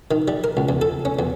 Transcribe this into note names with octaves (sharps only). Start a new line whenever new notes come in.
D#3
G3
A#4
C#2
E2
A4
C#4
E2